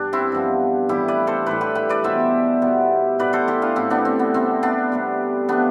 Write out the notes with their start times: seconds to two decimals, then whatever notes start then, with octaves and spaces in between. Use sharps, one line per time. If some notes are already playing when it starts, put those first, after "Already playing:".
Already playing: G2 D4
0.13 C4 E4
0.32 G2 F3 B3
0.89 A2 E3 G3 E4 G4
1.08 B4 D5
1.27 A4 C5
1.46 A2 E3 G3 B4 D5
1.61 G4 B4
1.75 G4 B4
1.89 B4 D5
2.04 B2 G3 B3 C5 E5
2.61 B2 G3 B3
3.19 A2 G3 B3 B4 D5
3.33 A4 C5
3.48 E4 G4
3.62 D4 F4
3.76 A2 G3 B3 C4 E4
3.90 B3 D4
4.05 C4
4.19 B3
4.34 C3 G3 B3 C4
4.63 B3 D4
4.92 C3 G3 B3
5.49 F3 A3 B3 D4